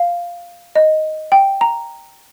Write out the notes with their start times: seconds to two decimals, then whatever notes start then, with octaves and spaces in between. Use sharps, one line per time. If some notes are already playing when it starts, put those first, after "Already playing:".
Already playing: F5
0.75 D#5
1.32 G5
1.61 A#5